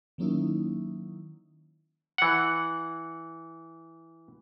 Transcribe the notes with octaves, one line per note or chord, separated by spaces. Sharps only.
D#3 F#3 A#3 C#4 D#4 E4
E3 F#5